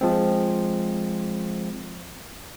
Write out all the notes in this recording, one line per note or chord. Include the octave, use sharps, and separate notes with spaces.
F3 G#3 C4